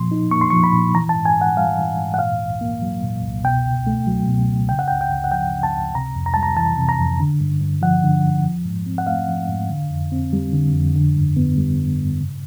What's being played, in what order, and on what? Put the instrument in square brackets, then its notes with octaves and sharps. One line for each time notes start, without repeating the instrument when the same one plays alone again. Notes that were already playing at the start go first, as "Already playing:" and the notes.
Already playing: [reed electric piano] A#2 F3 C6
D#4
A#3 C#6
C6
F3 C#6
B5
A#2
E3 A#5
A5
G#2
G#5
G#2
F#5
G3 F5
E3
G#2
F#5
A#2 F5
C2
A#3
F#3
A#2
C2
B2 G5
C#2
A3
F#3
B2
C#2
C#3 G5
F#5
G5
C#2
G5
C#2
F#5
F3 G5
C#3
A5
C#2
C3 A#5
F2
A#5
G3 A5
A#5
E3 A5
C3
A#5
F2
D3
G2
G2
F3 F#5
D3
G2
F3
G#2
C4
F#5
A3 F5
F3
G#2
D3
F2
C4
G3
D3
F2
D3
G2
B3
G3
D3
G2
C#3